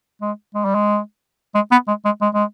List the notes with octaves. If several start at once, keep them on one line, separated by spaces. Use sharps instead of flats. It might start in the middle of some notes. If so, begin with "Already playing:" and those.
G#3
G#3
G3
G#3
G#3
B3
G#3
G#3
G#3
G#3